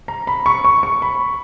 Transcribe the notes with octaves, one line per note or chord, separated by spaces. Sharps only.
A#5
B5
C#6
C#6
C#6
B5